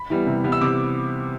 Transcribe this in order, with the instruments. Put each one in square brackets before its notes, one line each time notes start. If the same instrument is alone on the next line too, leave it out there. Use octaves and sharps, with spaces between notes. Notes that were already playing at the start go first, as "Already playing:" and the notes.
Already playing: [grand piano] B5
E3 G3 B3
C3
E3 G3 B3
E6
C3 D6